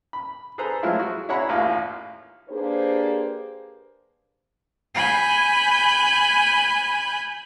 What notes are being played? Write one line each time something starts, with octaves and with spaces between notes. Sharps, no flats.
B5
G#4 A4 B4 C5 A#5
F3 F#3 G#3 A3 E4 F4
F#4
E4 G#4 C#5 F#5 A#5 B5
A1 D#2 A#3 F4 F5
A#3 D4 G4 G#4 B4 C5
G#5 B5 F#6 G6